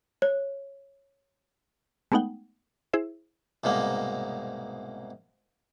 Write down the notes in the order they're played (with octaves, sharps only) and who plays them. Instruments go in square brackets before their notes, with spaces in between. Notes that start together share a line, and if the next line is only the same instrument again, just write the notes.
[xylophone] C#5
[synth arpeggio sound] G#3 A3 B3 D#4 F#5 G5
E4 G#4 C5 E5
[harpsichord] C2 G#2 B2 A#3